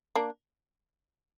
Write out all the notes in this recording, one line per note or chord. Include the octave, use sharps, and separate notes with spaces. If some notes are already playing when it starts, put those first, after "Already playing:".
A#3 D4